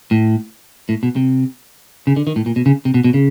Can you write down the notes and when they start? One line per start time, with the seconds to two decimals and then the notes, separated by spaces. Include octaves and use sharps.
0.11 A2
0.89 A2
1.03 B2
1.16 C3
2.07 C#3
2.16 D3
2.27 D#3
2.36 A2
2.46 A#2
2.56 B2
2.66 C#3
2.85 C3
2.94 B2
3.04 B2
3.14 C#3